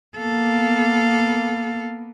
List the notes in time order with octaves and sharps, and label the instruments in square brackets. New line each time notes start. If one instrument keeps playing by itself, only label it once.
[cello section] A#3 B3 [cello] A4 F5